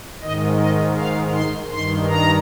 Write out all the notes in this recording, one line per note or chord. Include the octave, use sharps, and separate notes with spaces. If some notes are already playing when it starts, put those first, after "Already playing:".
G#2 D#3 D#5
D#5
F5
C6
G2 D#3 C6
A#5